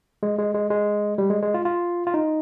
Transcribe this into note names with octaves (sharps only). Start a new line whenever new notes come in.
G#3
G#3
G#3
G#3
G3
G#3
G#3
F4
F4
F4
D#4